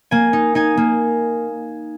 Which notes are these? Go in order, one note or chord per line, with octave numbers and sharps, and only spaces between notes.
A#3 G#5
D#4
D#4 G#5
A#3